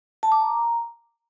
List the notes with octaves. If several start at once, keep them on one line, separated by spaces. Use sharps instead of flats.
A5
D6
A#5